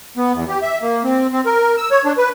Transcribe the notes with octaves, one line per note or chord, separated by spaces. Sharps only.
B3
E2
G4
E5
A#3
C4
C4
A#4
E6
C#5
D4
B4